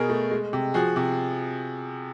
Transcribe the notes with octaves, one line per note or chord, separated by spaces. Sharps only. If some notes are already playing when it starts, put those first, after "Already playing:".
Already playing: B2 G#4 A#4
A3
G#3
C3
F3 F#4 G#4
C3